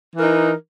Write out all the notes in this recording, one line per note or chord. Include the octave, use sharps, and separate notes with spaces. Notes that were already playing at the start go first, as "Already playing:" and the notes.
E3 D#4 A#4